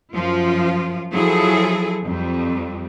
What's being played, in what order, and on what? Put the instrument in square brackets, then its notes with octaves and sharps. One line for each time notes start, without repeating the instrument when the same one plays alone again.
[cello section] F#2 F3 F4
F3 F#3 E4 G#4 A4
F2 G3